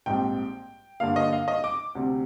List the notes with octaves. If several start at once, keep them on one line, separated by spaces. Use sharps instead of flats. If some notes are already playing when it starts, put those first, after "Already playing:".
A#1 G#2 G3 C4 G5
G2 D3 G3 A#3 F5
D#5
F5
D#5
D6
D2 C3 G3 C4